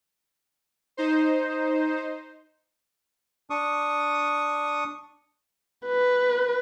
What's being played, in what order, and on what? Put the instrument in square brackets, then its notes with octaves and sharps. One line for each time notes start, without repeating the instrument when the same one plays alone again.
[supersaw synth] D#4 C5
[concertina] D4 C#6 D#6
[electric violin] B4